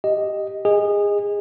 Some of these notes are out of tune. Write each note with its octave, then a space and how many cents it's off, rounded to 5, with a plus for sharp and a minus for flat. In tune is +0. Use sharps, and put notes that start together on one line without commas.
G4 +0 D#5 +0
G#4 -25 D#5 +0